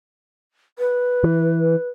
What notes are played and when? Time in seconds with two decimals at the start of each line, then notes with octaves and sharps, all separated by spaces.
0.79 B4
1.24 E3